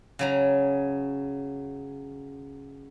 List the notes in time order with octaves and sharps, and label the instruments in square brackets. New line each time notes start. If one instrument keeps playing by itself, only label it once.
[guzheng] C#3 F#3 A#5